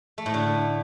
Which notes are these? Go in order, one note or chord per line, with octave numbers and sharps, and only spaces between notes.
A3
A2
D3